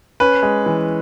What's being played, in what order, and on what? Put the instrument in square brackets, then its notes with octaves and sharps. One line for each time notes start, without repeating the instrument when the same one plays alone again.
[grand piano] C#4 B4
G#3
E3